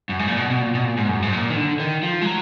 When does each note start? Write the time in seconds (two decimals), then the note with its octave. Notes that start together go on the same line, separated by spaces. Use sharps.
0.09 F#2
0.19 G#2
0.28 A#2
0.38 B2
0.51 B2
0.61 A#2
0.75 B2
0.85 A#2
0.97 G#2
1.09 F#2
1.22 G#2
1.33 A#2
1.50 D#3
1.56 D3
1.80 D#3
2.03 F3
2.21 G#3
2.26 F#3